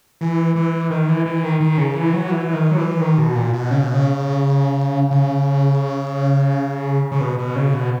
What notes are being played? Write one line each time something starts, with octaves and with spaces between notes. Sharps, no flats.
E3
E3
D#3
E3
E3
D#3
D#3
C#3
E3
F#3
E3
D#3
F#3
E3
D#3
B2
A#2
B2
C#3
B2
C#3
C#3
C#3
B2
B2
C#3
B2